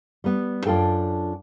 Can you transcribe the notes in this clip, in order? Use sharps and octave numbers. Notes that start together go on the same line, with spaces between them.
G3 B3
F#2 D4 F4 A4 G5